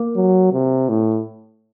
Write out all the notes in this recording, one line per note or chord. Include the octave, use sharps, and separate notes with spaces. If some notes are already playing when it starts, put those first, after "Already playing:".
Already playing: A#3
F#3
C3
A2